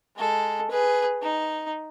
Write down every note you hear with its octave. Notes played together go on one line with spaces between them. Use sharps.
G#3 A4
G#4 B4
D#4